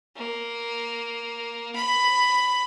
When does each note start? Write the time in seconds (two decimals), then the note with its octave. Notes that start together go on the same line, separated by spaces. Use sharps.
0.16 A#3
1.75 B5